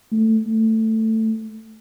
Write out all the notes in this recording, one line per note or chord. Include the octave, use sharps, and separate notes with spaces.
A3
A3